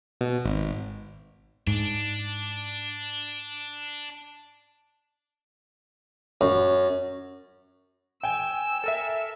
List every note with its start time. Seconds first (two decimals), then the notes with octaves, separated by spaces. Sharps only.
0.21 B2
0.45 G#1
1.67 G#2 D4
6.41 F#2
8.23 G5 G#5 E6
8.84 A4 A#4 E5